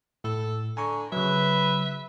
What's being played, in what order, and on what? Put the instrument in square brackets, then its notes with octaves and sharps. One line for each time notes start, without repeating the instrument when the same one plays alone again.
[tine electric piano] A2 [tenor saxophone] A4
[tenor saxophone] D3 [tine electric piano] G#5 A#5 C#6
[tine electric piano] C#3 F#3 [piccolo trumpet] B4 [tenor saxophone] E5